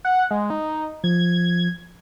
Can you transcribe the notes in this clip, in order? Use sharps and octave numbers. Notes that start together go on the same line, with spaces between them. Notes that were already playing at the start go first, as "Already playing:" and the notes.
F#5
G#3
D#4
F3 G#6